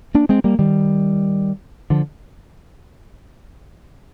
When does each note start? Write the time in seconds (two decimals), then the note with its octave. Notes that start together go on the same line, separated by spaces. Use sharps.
0.14 A#3 D4
0.29 G#3 C4
0.44 G3 A#3
0.59 D#3 G3
1.90 D3 F3